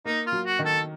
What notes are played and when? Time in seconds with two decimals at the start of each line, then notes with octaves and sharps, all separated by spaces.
0.05 A#3 D#4
0.26 F4
0.32 F#3
0.46 F#4
0.59 D#3
0.66 A4